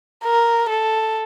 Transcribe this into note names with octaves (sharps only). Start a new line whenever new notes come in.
A#4
A4